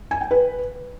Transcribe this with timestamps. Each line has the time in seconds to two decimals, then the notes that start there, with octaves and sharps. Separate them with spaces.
0.11 G#5
0.21 G5
0.31 B4